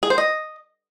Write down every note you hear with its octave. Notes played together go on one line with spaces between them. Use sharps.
G#4
C5
D#5